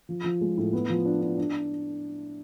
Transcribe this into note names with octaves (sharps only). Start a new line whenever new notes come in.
F3
F3
G#3
A2
B3
F3
D4
D4
D4